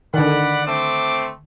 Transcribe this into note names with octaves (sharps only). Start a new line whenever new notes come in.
D3 D#3 D5 F#5 B5
A3 C4 D6